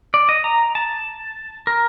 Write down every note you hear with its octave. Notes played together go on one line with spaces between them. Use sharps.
D5
D#5
A#5
A5
A#4